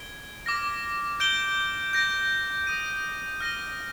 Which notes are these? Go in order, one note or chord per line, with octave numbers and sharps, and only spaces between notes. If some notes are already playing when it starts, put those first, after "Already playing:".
Already playing: G#6 D7 G7
D6 F6 A#6
G6 D7 G7
G6 A#6 D7
D#6 A#6 D#7
F6 A#6 D#7 G7